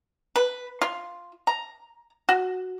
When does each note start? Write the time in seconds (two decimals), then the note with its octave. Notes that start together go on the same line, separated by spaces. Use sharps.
0.36 B4
0.82 F4
1.47 A#5
2.29 F#4